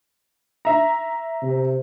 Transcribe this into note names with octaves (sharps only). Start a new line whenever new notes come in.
E5 A#5
C3